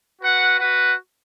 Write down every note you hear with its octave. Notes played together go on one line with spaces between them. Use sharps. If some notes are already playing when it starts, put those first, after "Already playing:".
F#4 B4 F#5
F#4 B4 F#5